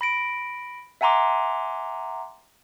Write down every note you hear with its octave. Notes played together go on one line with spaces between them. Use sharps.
B5 A#6 D7
E5 F#5 G#5 A#5 C6 D6